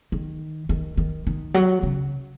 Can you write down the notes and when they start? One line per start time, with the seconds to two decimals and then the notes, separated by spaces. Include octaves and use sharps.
0.12 D#3
0.69 D#3
0.97 D#3
1.27 D#3
1.54 F#3
1.83 C#3